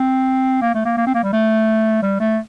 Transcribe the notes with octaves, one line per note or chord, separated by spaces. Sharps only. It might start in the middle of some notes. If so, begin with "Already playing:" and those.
Already playing: C4
A#3
A3
A#3
A#3
C4
A#3
G3
A3
G3
A3